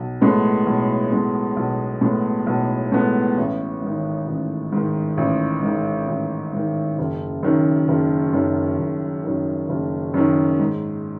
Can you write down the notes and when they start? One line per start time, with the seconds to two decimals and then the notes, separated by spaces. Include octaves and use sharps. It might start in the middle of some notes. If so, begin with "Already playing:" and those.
Already playing: B1
0.21 A2 G#3 B3
0.66 B1
1.11 A2 G#3 B3
1.56 B1
2.01 A2 G#3 B3
2.46 B1
2.92 A2 G#3 B3
3.37 A1
3.82 G#2 D#3
4.28 A1
4.72 G#2
4.77 D#3
5.17 A1
5.63 G#2 D#3
6.08 A1
6.53 G#2 D#3
6.98 F#1
7.43 F#2 D#3
7.88 F#1
8.33 F#2 D#3
8.79 F#1
9.24 F#2 D#3
9.69 F#1
10.14 F#2 D#3
10.59 G#2